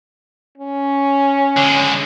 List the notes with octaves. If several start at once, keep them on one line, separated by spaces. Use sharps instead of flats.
C#4
D3 G#3